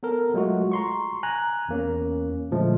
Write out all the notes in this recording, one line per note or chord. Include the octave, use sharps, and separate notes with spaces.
B3 A4 A#4
F#3 G#3 A3 F4 F#4
A#5 C6 C#6
G#5 A#5 F#6
E2 A#3 C#4
A#2 D3 F3 G#3 A3